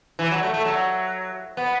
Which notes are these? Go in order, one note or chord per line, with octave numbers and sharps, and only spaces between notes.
E3
F#3
A3
A3
F#3
B3